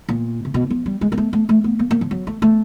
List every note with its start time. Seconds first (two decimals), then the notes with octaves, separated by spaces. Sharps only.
0.09 A#2
0.45 C3
0.54 B2
0.70 F3
0.86 G3
1.01 G#3
1.12 A#3
1.18 A3
1.33 A3
1.49 A3
1.64 B3
1.79 A#3
1.91 A#3
2.01 F3
2.11 F#3
2.27 A3
2.42 A3